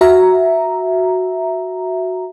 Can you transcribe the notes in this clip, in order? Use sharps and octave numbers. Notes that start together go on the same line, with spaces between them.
F#4 E5 A#5